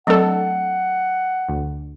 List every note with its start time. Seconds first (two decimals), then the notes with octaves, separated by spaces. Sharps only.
0.07 F#3 A3 C4 D4 A4 F#5
1.49 D2